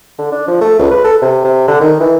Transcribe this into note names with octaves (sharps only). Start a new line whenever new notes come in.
D3
D4
F3
A3
C#2
B4
A4
C3
C3
D3
D#3
E3